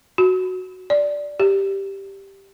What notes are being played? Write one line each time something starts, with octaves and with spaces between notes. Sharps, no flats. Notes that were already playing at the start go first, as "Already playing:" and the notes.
F#4
D5
G4